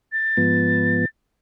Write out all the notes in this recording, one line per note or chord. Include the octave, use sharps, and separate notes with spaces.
A6
G#2 F3 B3